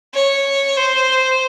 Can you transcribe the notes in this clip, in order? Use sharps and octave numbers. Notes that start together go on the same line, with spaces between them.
C#5
C5